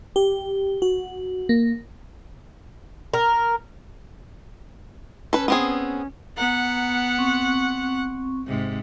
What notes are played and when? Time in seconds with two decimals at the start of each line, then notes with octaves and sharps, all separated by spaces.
0.16 G4
0.82 F#4
1.49 A#3
3.14 A#4
5.33 C#4 A4 B4
5.48 B3 C4 G#4
6.37 B3 F#5 A#5
7.19 C4 C#6
8.47 G#2 C3